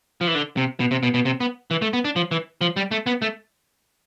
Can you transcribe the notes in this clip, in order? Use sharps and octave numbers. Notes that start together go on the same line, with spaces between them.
F3
E3
D3
C3
B2
C3
B2
B2
C3
B3
E3
A3
B3
D4
F3
E3
F3
G3
A3
B3
A3